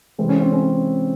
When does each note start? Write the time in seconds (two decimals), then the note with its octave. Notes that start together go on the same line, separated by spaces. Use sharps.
0.19 C3 E3 G#3 C4
0.29 C#4
0.41 C4
0.53 C#4